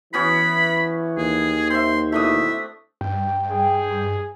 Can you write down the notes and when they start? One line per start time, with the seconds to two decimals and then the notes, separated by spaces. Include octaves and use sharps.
0.14 E3 B3 C#4 F#4 B5
1.17 D#2 G#4
1.70 C4 E5 C6
2.12 B2 A3 D4 E4 E5 D#6
3.01 G2 G5
3.51 G#4